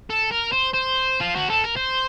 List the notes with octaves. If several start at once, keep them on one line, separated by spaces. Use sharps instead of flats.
A4
A#4
C5
C5
F4
F#4
A4
A#4
C5